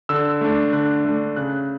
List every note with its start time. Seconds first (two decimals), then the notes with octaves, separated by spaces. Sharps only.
0.09 D3 E6
0.41 A3 D4
0.73 D3 F#6
1.05 A3 D4
1.36 C#3 F#6